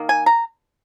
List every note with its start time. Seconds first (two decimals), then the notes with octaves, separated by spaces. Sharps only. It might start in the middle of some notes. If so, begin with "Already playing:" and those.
Already playing: D#3 A#3
0.09 G#5
0.26 A#5